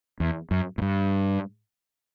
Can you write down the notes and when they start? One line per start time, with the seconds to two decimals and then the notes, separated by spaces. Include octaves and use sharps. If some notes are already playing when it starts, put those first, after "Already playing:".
0.20 E2
0.51 F#2
0.78 A2
0.82 G2